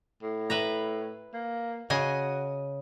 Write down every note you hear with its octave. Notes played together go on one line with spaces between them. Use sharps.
A2
B4 E5 A#5
A#3
C#3 F#4 D#5 G#5